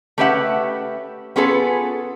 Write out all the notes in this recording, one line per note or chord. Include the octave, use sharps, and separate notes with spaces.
A3 C#4 G4 B4 E5 F#5
B3 C#4 F4 G#4 A4 B4